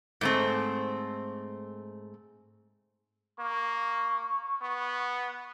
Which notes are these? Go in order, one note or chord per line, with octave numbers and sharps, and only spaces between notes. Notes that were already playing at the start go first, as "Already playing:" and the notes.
G#2 A3 C4
A#3 C#6
B3